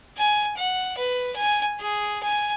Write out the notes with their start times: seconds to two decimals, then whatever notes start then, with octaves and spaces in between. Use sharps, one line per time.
0.17 G#5
0.57 F#5
0.98 B4
1.36 G#5
1.80 G#4
2.23 G#5